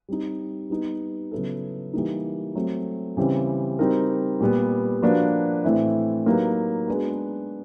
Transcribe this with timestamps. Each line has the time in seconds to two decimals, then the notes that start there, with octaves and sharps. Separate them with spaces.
0.09 G3 C4 D#4
0.70 G3 B3 D#4
1.32 C#3 F#3 B3 E4 A4
1.94 E3 G3 A#3 D#4
2.55 F#3 A3 C4
3.17 C#3 E3 G3 C4
3.79 G3 C4 D#4 F#4 A#4
4.41 A#2 G3 B3
5.02 F3 A#3 D4 F#4 B4
5.64 A2 E3 A3 C4 E4
6.26 F#3 A#3 D#4 G4 B4
6.87 G#3 B3 D4 F#4 B4